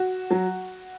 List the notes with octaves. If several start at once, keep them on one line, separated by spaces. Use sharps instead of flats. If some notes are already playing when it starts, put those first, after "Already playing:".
Already playing: F#4
F#3